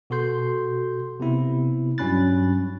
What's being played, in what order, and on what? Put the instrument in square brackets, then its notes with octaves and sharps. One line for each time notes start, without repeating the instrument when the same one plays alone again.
[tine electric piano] B2 F#4 A4 C6 G6
C3 B3 E4
G2 F#3 C#4 B5 F#6 A6